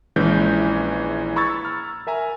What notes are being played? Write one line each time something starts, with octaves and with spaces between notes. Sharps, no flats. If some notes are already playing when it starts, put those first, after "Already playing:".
A#1 E3 G#3 C#4 G6
A#5 B5 C#6 E6 G#6 A6
F6
A#4 E5 G#5 A#5